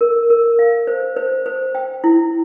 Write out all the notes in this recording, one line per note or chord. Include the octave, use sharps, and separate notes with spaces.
A#4
A#4
F5
C5
C5
C5
G5
E4